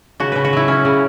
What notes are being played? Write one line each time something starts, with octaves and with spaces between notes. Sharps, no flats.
C#3 F#4
C#3 B4
F#4
F#3 E4
C#4
C#3